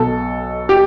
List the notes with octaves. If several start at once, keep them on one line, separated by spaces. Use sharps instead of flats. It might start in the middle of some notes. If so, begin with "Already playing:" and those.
Already playing: B1 B2 A4
G4